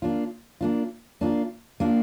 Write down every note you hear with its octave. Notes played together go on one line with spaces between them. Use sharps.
A#3 D4 F4
A#3 D4 F4
A#3 D4 F4
A#3 D4 F4